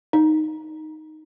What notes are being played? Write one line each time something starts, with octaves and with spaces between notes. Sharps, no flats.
D#4